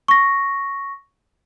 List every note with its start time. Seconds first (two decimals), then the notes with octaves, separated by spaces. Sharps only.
0.08 C#6 A#6